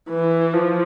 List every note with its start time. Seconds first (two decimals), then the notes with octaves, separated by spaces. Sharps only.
0.10 E3
0.53 F3